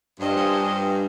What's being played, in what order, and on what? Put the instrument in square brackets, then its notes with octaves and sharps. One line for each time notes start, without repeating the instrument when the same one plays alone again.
[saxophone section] G2 [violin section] D4 F4 C5 D#5 G#5
[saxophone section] G2